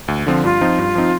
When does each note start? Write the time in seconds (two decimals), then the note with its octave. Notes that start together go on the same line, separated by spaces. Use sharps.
0.08 D2
0.27 D3 F3 C4 F4
0.44 G2 F4
0.61 F3 C4 D#4
0.78 G2
0.95 F3 C4 D#4